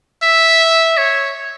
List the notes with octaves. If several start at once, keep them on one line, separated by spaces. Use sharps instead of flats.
E5
C#5